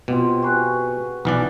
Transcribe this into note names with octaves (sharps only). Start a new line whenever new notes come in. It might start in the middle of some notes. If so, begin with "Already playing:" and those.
B2 C4 F4 G4
F#4 G#4 B4
B1 E3 B3 D5